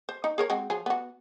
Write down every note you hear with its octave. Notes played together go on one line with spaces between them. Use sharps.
C5
D#4
G#4 A#4 C#5
G#3 C4 F#4
F3 F#3 G#4
B3 F#4